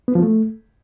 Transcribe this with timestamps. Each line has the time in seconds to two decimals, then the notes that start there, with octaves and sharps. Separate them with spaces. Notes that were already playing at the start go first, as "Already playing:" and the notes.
0.08 B3
0.15 F3
0.22 A3